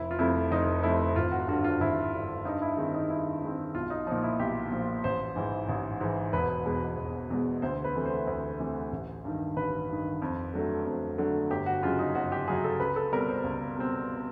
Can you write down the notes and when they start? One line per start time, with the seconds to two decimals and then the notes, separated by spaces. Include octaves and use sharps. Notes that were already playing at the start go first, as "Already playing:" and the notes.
Already playing: F1 E4
0.11 F4
0.18 F2 C3 F3 A3 E4
0.51 F1 D#4
0.83 F2 C3 F3 A3 E4
1.16 G#1 F4
1.32 F#4
1.48 G2 D3 F#4
1.64 F4
1.80 G#1 E4
2.13 G2 D3
2.45 G2 D#4
2.62 E4
2.77 D#3 G#3 C4
2.94 D#4
3.10 G2 E4
3.42 D#3 G#3 C4
3.75 B1 F4
3.90 D#4
4.07 A#2 F3 D#4
4.23 E4
4.39 B1 G4
4.72 A#2 F3
5.04 A1 C5
5.36 G#2 E3
5.69 A1
6.01 G#2 E3
6.33 E1 B4
6.65 E2 B2 G#3
6.97 E1
7.30 E2 B2 G#3
7.62 D2 C5
7.84 B4
7.95 C3 E3 A3
8.06 C5
8.27 D2
8.59 C3 E3 A3
8.92 A1
9.25 G2 D#3
9.56 A1 B4
9.89 G2 D#3
10.22 F2
10.54 D3 F#3 A3
10.86 F2
11.18 D3 F#3 A3
11.50 G1 G4
11.66 F#4
11.83 F#2 C#3 F#3 F4
11.99 D#4
12.15 G1 F#4
12.32 G4
12.48 F#2 C#3 F#3 G#4
12.64 A4
12.80 C#2 B4
12.96 A4
13.12 B2 G3 C4 A#4
13.29 C5
13.44 C#2
13.77 B2 G3 C4